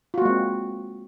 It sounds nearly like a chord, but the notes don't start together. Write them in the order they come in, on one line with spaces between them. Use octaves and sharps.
F4 F#4 A#3 G#3 C4